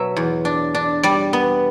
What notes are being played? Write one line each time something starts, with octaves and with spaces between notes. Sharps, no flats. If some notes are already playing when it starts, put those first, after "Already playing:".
Already playing: B2 F#3 E5
E2
D4
D4
G3 D5
B3